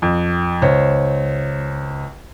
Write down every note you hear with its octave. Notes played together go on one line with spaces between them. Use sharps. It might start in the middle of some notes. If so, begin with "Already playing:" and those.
F2
C#2 C5 C#5